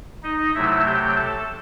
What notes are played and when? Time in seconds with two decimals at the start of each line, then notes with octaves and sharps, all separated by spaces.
0.23 D#4 D#5
0.54 C3 F#3 A3 E4 E5
0.86 G4 G5
1.16 A4 A5